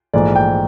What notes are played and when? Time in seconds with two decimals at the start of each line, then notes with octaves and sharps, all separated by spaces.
0.13 A#1 G#2 E3 A3 D5
0.36 G5